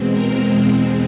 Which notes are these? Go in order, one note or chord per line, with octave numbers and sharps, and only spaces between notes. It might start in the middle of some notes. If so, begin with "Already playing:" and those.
Already playing: E2 B2 G#3 C4
A#4